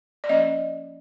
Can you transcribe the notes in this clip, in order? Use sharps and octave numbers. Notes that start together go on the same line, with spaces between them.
D5
F3 A#3 C#4 D#5